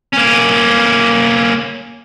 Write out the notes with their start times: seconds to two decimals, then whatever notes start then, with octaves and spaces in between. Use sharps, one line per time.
0.13 A#3 C#4